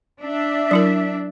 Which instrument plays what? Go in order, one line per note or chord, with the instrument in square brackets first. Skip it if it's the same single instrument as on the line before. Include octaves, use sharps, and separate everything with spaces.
[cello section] D4 E5
[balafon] F#3 E4 A#4